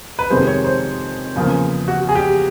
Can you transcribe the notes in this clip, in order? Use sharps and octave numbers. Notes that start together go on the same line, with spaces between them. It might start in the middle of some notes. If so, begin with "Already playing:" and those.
B4
F2 C3 D#3 G#3 C5
C#5
C5
E2 C#3 F3 A#3
F#4
G#4
G4